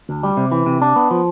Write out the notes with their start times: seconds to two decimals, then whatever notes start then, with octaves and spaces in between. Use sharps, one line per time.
0.09 D2
0.23 G3
0.37 C3
0.51 E3
0.66 C3
0.82 D4
0.96 B3
1.11 F3